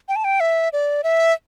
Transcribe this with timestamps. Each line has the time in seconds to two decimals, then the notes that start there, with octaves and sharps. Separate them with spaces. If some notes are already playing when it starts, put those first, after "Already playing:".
0.09 G5
0.16 A5
0.24 G5
0.40 E5
0.73 D5
1.04 E5